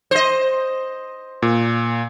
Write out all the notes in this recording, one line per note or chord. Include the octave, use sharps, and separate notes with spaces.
C5 D#5
A#2